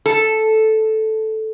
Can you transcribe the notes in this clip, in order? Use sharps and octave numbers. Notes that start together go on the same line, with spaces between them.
A4